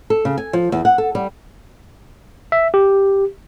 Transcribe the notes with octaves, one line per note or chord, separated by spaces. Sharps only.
A4
C#3
G#5
F3
E2
F#5
A4
G3
E5
G4